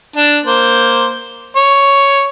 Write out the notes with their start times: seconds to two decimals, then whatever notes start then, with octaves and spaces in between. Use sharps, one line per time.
0.16 D4
0.44 A#3 C5
1.56 C#5